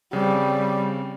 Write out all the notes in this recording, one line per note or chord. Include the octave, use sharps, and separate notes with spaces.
C#3 G3 C4